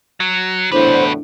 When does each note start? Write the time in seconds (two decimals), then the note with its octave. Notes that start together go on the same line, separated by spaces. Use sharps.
0.20 F#3
0.72 E2 A2 D3 F#3 D4 B4 C5 B5